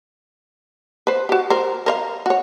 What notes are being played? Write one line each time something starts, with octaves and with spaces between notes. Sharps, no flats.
B4 C5
F#4 G4
A#4 C5
A#4 C5 F5
F#4 C#5